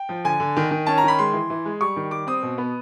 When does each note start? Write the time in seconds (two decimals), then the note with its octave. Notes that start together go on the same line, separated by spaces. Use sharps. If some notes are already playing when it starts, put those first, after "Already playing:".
Already playing: G5
0.09 F3
0.24 D3 G#5
0.40 D3
0.56 D#3
0.71 D#3
0.86 C#4 A5
0.98 A#5
1.03 D#3 B5
1.19 G#3 C6
1.33 E3
1.50 E3
1.65 G#3
1.81 G3 C#6
1.96 D#3
2.11 G3 D6
2.27 C4 D#6
2.43 B2
2.58 B3